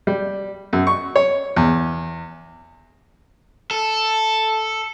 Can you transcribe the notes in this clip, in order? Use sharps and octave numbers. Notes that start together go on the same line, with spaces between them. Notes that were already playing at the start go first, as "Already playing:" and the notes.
G3
F#2
C#6
C#5
E2
A4